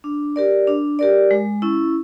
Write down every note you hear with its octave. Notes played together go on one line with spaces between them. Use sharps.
D4
G4 A#4 D5
D4
G4 A#4 D5
G#3
C#4 E4